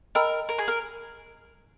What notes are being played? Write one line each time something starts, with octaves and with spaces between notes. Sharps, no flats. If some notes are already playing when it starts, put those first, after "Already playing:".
A#4 D#5 G5 B5 E6
A#4
G#4
A#4